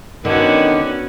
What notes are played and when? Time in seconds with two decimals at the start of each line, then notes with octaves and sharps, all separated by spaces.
0.25 D3 D#3 B3 C#4 F#4